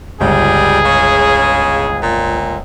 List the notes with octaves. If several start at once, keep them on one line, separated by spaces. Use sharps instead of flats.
G1 C#2 G3 G#4
C#3
A#2